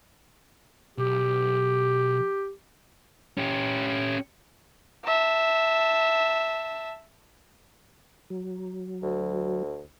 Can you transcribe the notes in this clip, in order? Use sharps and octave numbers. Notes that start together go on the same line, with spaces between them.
B1 G4
C#4 G4
E5 A5
F#3
D2